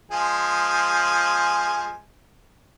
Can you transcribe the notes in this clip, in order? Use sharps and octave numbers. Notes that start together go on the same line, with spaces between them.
F3 G#3 G#5